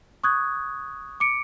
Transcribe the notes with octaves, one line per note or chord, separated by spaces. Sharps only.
C#6 D#6 F#6 G#6
D6 C#7 D7